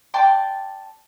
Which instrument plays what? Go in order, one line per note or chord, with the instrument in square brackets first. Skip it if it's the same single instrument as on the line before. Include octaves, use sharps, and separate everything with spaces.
[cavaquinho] D5 G5 A5 C6